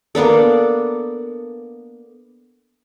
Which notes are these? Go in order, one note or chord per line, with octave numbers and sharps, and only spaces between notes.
A#3 B3 D4 A4